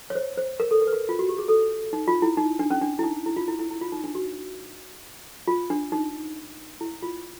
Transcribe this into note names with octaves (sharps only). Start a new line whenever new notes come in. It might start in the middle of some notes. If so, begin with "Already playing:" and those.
C#5
C5
C5
A#4
A4
A#4
B4
A#4
F4
F#4
G4
G#4
A4
D#4
F4
E4
D#4
D4
C#4
D4
E4
D#4
E4
F4
E4
E4
E4
F4
D#4
D4
F#4
F4
D4
D#4
E4
F4